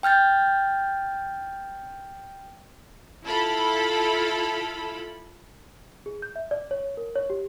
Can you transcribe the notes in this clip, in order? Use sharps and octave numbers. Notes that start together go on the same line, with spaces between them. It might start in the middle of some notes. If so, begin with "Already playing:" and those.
G5 F6 G6 A6
E4 F4 A4 B5
G#4
G6
E5
D5
C#5
A#4
C#5
G4